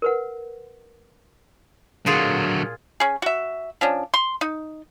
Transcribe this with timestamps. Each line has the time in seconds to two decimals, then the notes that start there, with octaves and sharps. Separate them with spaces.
0.02 A#4 B4 F#5
2.06 A#2 D3 F#3 F4 G#4
3.00 C#4 G#4
3.22 F#4 E5
3.81 F3 C#4 D4
4.14 C6
4.41 D#4